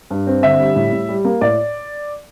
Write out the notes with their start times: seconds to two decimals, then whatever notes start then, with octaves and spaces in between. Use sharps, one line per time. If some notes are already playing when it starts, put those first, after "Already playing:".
0.10 G2
0.27 C4
0.43 D3 E5
0.59 G3
0.76 A2
0.93 A2
1.09 G3
1.25 A#3
1.41 A2 D5